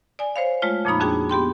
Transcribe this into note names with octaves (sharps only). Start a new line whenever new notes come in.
D5 G#5
C5 C#5 F5
G#3 A3 F4 C#5
F2 A#2 F3 A#3 D#4 B5
F2 D4 F#4 G#4 G5 G#6
B3 G4 G5 C6